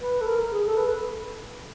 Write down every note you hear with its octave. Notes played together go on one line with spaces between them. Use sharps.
B4
A4
A#4
G#4
A4
B4